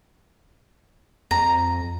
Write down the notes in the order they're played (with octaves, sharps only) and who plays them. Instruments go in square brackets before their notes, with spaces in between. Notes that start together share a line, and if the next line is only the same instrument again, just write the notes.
[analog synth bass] F2 [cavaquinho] A#5